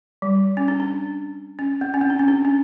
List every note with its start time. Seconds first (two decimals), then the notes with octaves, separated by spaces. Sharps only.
0.22 G3
0.57 C#4
0.68 D4
0.80 D4
1.59 C#4
1.81 C4
1.94 C#4
2.01 C4
2.10 D4
2.19 C#4
2.28 D4
2.45 C#4